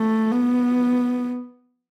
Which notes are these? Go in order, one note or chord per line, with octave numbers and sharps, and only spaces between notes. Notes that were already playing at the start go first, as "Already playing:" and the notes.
Already playing: A3
B3